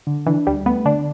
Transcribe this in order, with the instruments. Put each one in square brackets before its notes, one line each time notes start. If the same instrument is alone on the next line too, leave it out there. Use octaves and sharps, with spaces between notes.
[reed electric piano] D3
[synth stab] E3 [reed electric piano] D4
[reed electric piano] D2 [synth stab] G3
[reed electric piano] A3 [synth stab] B3
[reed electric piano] D3 [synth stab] D4